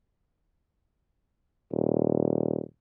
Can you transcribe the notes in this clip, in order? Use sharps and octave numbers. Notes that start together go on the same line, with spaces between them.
D#1